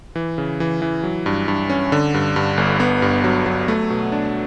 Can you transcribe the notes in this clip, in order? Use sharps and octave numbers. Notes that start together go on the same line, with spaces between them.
E3
C#3
E3
E3
F#3
G2
G2
C#4
D3
G2
G2
G1
B3
G2
F#3
F#3
A3
B2
D4